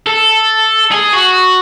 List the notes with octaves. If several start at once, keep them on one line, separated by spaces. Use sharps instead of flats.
A4
G#4
F#4